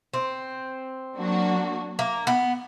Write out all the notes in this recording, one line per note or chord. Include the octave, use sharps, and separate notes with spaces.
C4
F#3 A#3 D4 F#4
A#3
B3